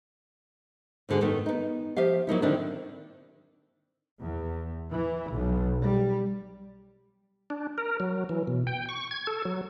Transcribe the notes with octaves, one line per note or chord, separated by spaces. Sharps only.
D2 G#2 D3 F#4 G#4
F#2 D#3 A3 B3
B3 D#4
F3 G4 E5 F5
F#3 A#3 D#4 E4
D3 D#3 A#3 C4 D4 E4
E2
E3
B1
G3
D4
A#4
F#3
E3
B2
G5
C#6
G#6
A4
F#3